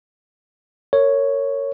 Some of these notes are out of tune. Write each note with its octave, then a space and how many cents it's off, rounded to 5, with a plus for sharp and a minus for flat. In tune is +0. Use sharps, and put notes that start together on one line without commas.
A#4 -25 C#5 +0